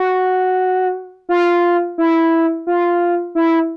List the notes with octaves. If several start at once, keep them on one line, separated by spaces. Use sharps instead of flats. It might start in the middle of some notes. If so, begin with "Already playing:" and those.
Already playing: F#4
F4
E4
F4
E4